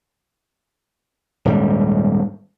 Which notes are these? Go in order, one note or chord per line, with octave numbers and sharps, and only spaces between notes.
D#1 G#2 G3